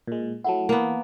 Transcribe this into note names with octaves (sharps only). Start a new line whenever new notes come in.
A#2 G#3
F#3 A3 E4 F#5 A5
E3 A#3 B3